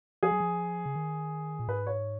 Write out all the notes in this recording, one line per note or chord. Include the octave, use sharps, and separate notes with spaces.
F3 G#4
F#3
F3
C#3
D#3
A#2
G#2 B4
C#5